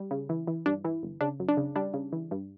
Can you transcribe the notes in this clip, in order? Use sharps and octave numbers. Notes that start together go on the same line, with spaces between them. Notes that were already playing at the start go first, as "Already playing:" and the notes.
Already playing: G3
C#3
E3
E3
G2 D4
E3
G1
C#3 D4
F#2
D4
C#3
G3 D4
C#3
E3
G2